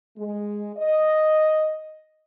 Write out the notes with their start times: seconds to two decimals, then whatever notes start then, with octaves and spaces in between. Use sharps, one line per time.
0.17 G#3
0.77 D#5